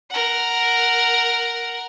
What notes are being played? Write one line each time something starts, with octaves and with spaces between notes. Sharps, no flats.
A#4 F#5